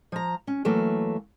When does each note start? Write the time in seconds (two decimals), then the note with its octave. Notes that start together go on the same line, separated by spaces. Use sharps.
0.12 F3 A#5
0.47 C#4
0.65 E3 F#3 A3 A#3